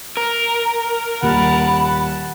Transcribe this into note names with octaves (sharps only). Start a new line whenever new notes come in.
A#4
D#1 F#5 A5 B5